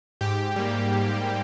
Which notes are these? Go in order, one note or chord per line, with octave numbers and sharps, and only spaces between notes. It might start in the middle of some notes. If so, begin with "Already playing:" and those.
G#2 G4
G3 A#3
G#2
G3 A#3